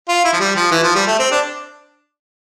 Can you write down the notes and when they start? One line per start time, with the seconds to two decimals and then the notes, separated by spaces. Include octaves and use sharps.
0.09 F4
0.25 E4
0.33 F3
0.40 G3
0.56 F3
0.71 E3
0.84 F3
0.95 G3
1.07 A3
1.19 C4
1.31 D4